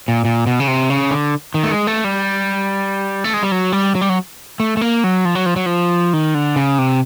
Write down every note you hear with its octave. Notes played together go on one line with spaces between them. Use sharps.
A#2
A#2
B2
C#3
C3
C#3
D3
D#3
A3
G#3
A3
G3
A3
G#3
G3
F#3
G3
F#3
G3
F#3
A3
A3
A#3
F#3
F3
F#3
F3
F#3
F3
D#3
D3
C#3
C3